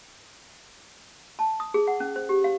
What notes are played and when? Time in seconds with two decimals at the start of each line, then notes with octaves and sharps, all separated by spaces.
1.39 A5
1.60 D#6
1.74 G#4
1.87 F#5
2.00 C#4
2.16 C5
2.29 G4
2.44 F5